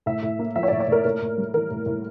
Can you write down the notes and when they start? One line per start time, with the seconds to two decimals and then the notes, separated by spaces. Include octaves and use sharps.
0.06 A2 E5
0.23 A2
0.39 A#3
0.56 F3 E5
0.63 C#5
0.68 D5
0.72 A2
0.80 C#5
0.88 A2 A#4
1.04 A2 A#4
1.22 A2
1.38 G3
1.54 E3 A#4
1.71 A2
1.86 A2